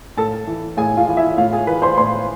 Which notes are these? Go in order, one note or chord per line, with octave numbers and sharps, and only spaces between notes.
A2 A4 A5
E3
A2 G#4 G#5
F4 F5
E3
E4 E5
A2 F4 F5
G#4 G#5
E3 B4 B5
C5 C6
A2 C5 C6